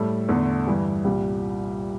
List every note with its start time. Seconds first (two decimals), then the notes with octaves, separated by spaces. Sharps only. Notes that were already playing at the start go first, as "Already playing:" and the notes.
Already playing: A2 G3 A4
0.29 E2 D3 A3
0.67 G2 E3 G3
1.04 C2 A#2 G3 G4